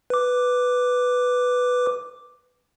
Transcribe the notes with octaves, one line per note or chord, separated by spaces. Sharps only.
B4 D6